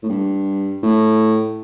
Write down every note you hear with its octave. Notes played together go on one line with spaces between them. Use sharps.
A2
G2
A2